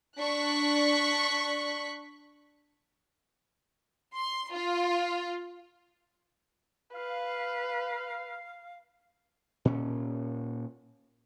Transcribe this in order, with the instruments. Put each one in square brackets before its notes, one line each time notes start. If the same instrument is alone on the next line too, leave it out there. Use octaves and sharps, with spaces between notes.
[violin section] D4 C#6 F#6 B6
C6
F4
[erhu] B4 [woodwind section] F5
[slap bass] A#2 C#4